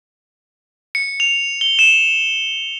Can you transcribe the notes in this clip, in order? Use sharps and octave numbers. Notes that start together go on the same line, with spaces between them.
C#7
F7
G7
E7